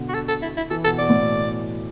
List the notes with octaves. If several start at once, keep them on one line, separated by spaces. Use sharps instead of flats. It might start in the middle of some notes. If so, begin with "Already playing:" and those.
Already playing: B2 D3
F#4
A4
A4
E4
E4
E3 A4
B2 A4
B2 D5
A2
B2